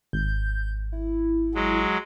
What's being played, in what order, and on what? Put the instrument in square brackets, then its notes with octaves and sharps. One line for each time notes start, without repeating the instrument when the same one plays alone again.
[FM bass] G#1 [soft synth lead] G6
[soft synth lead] E4
[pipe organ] F#3 G#3